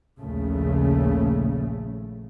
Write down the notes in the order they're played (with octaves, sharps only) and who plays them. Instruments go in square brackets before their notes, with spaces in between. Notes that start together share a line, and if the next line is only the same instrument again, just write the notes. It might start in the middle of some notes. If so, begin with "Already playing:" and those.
[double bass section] A#1 D#2 A#2 C#3 A3